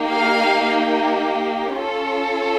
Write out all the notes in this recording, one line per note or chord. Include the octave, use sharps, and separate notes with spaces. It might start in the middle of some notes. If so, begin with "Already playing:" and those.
Already playing: A#3 D#4 G4
F5
C#4 F4 A4